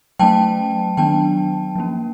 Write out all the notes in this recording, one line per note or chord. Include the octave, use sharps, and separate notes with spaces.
F#3 A3 C#4 G5 A5
D#3 F#3 B3 D4 G5 A5
F3 A#3 C#4